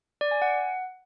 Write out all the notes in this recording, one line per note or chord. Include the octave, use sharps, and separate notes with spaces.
D5
G#5
F#5